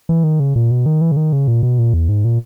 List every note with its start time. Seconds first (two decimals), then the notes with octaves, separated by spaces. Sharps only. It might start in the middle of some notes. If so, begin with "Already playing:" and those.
0.09 E3
0.24 D#3
0.40 C#3
0.56 A#2
0.71 B2
0.86 D#3
1.01 E3
1.12 C#3
1.17 D#3
1.33 C#3
1.48 A#2
1.63 B2
1.79 A#2
1.94 E2
2.09 G#2
2.25 A#2